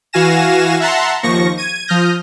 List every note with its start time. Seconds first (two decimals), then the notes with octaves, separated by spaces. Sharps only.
0.13 E3 F#4 F5 G#5 A#6 E7
0.80 E5 F#5 A5 A#5 C6
1.23 D#2 F3 C#6 A#6
1.57 G#6 D#7
1.88 F3 D#6 F6 G6 A#6